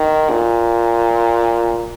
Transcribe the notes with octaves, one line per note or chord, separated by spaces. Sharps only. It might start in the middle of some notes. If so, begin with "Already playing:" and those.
Already playing: D#3
A#2